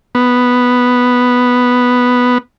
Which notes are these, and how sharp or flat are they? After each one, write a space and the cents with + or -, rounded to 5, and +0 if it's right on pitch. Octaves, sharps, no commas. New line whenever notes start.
B3 +0